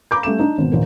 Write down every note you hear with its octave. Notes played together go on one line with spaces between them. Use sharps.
A#5 B5 D6 G6
G3 A3 C#4 E7
D4 D#4
G#1 B2
A#1 D#2 D#3